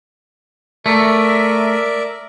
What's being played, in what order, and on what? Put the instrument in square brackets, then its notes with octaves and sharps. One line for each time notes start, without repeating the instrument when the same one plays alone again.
[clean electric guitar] A3 [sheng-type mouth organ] A#4 D5 E5